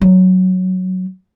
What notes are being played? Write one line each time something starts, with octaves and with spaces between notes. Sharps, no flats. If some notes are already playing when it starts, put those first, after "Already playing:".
F#3